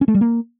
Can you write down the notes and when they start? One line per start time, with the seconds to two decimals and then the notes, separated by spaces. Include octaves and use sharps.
0.01 C#4
0.08 A3
0.15 G3
0.21 A#3